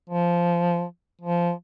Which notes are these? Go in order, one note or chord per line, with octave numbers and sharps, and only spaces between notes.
F3
F3